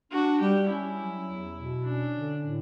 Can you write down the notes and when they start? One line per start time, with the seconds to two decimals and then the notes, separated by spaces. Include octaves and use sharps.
0.12 D4 F#4
0.40 G3 G4
0.69 C#4 E4
0.98 F#3
1.27 E2
1.55 B2
1.84 C#4 D4
2.13 D3
2.42 A2